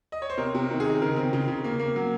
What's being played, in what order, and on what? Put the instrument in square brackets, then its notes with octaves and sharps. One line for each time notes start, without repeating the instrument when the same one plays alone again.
[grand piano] D#5
C#5
C5
C3 A#4
C3 A#4
D#3
G#4
D#3
C#3 A#4
C4
C#3
C#3
A#3
A#3
F#3